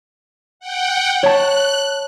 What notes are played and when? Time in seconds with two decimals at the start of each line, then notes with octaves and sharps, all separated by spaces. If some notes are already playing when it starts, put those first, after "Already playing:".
0.60 F#5 G5
1.23 C#5 A5 F#6